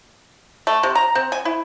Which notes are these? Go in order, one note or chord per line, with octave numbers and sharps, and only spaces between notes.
A3
C3
A#5
C4
G#5
E4